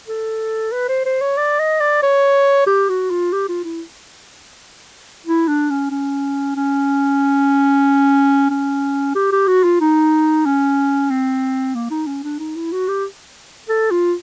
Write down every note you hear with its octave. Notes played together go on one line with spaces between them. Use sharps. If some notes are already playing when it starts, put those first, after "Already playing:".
A4
B4
C5
C5
C#5
D5
D#5
D5
C#5
G4
F#4
F4
G4
F4
E4
E4
D4
C#4
C#4
C#4
C#4
G4
G4
F#4
F4
D#4
C#4
C4
A#3
D#4
C#4
D4
D#4
E4
F#4
G4
A4
F4